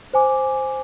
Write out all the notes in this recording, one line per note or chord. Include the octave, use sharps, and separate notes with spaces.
C5 G#5 D6